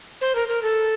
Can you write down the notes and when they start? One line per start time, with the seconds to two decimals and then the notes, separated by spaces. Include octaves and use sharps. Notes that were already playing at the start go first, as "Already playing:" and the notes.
0.21 C5
0.35 A#4
0.48 A#4
0.63 A4